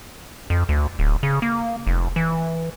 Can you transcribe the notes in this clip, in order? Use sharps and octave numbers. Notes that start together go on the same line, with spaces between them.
F2
D2
D1
C#3
A#3
F1
E3